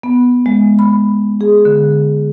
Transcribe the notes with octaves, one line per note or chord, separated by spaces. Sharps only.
B3
G#3
B5
G#4
D3